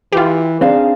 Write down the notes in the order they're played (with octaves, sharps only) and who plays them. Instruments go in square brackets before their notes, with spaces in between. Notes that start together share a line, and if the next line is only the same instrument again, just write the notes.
[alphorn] E3 [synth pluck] F4 G4
[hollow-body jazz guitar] C4 D4 D#4 [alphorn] G#4 [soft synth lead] F5